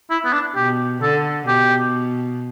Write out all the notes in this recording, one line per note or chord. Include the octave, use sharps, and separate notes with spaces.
E4
B3
D4
B2 G4
D3 A4
B2 G4